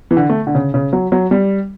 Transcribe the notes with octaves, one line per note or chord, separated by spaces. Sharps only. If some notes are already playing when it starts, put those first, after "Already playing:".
E3
D3
A3
D3
C#3
C#3
F#3
F#3
G3